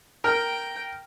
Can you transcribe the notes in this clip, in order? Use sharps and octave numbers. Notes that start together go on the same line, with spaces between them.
A#4 G5